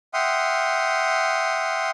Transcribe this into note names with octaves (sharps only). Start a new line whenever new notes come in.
E5 F#5 G5 C6 D#6 F6